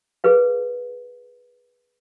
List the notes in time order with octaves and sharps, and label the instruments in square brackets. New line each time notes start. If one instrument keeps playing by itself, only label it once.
[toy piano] G#4 A#4 B4 F5